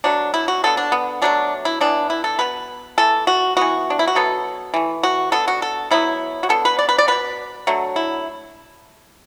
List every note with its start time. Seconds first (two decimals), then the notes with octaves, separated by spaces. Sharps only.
0.04 B2 F#3 A3 D4
0.34 E4
0.48 F#4
0.64 D3 B3 A4
0.77 D4
0.92 B3
1.22 B2 F#3 A3 D4
1.65 E4
1.81 E3 B3 D4
2.10 E4
2.24 A4
2.39 B2 B3 B4
2.98 E3 A3 A4
3.27 F#4
3.57 E3 B3 F#4
3.90 D4
3.99 E4
4.07 F#4
4.15 B2 F#3 B3 A4
4.74 E3 A3
5.03 F#4
5.32 D3 B3 A4
5.48 F#4
5.62 A4
5.91 B2 F#3 B3 E4
6.43 F#4
6.49 D3 B3 A4
6.65 B4
6.79 D5
6.89 B4
6.98 D5
7.08 B2 B3 B4
7.67 D3 F#3 A3
7.96 E4